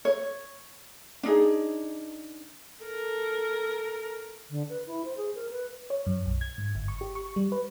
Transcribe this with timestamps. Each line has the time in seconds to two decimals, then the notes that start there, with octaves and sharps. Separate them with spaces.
0.05 C#5
1.23 D4 D#4 G#4
2.83 A4 A#4
4.50 D3
4.69 B4
4.87 E4
5.05 C5
5.17 G#4
5.35 A#4
5.51 B4
5.90 C#5
6.06 F#2
6.26 B1
6.41 G#6
6.58 G#2
6.75 G1
6.88 C#6
7.01 G4
7.15 C#6
7.36 G3
7.52 B4